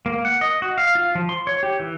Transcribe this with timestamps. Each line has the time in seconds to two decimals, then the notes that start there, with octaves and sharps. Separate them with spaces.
0.06 A#3
0.25 F#5
0.41 D#5
0.62 F#4
0.78 F5
0.95 F4
1.15 F3
1.29 C6
1.47 C#5
1.63 G4
1.80 E3